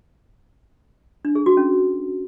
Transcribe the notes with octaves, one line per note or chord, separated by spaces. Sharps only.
D4
G#4
F#4
C#4